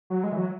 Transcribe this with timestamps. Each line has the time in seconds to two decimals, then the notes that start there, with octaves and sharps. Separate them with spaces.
0.10 F#3
0.24 G#3
0.32 E3
0.37 F#3